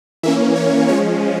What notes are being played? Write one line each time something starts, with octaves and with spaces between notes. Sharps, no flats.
E3 A#3 C#4 E5
C#5
F3 G#3 C#4 C#5